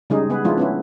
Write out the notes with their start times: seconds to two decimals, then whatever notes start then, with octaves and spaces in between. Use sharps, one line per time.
0.10 C#3 G3 G#3 D#4 G#4
0.30 B3 G#4 B4
0.44 F3 G#3 A3 D4 E4 F4
0.58 B3 C#4 E4